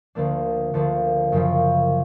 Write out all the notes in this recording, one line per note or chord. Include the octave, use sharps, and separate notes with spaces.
D2 D3 F3 A#3 D4
D2 D3 F3 A#3 D4
F#2 C#3 F3